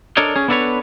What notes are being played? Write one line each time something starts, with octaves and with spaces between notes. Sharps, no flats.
D4 A4 A#4 C#5 D#5
C#4 G#4
B3 D4 E4 A4 B4 C#5